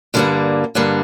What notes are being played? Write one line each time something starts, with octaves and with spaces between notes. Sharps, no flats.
G2 D3 G3 A#3
G2 D3 G3 A#3